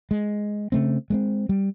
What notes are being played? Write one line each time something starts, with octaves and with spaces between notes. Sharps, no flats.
G#3
C#3 A3 C4
G#3 A#3 C4
G3